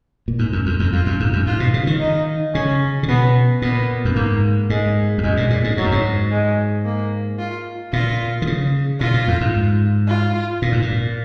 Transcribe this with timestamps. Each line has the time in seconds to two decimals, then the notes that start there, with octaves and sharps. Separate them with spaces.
0.28 A#2
0.39 G#2
0.53 F#2
0.66 F2
0.80 F2
0.93 F2 F4
1.06 F#2
1.20 G#2
1.33 F#2
1.47 G#2 F4
1.60 B2
1.74 C#3
1.87 D#3
2.00 D#4
2.54 C#3 C#4
3.03 C#3
3.08 B2 B3
3.62 A#2 B3
4.05 F#2
4.16 G#2 A#3
4.70 G#2 G#3
5.18 F2
5.23 F#2 G#3
5.37 A#2
5.50 A#2
5.64 G#2
5.77 G#2 F#3
5.84 F#2
5.92 G#2
6.32 G#3
6.85 A#3
7.39 F4
7.93 A#2 F4
8.42 D#3
8.47 C#3
9.01 A#2 F4
9.14 A#2
9.28 F2
9.41 G#2
10.08 F4
10.62 A#2
10.72 G#2
10.82 A#2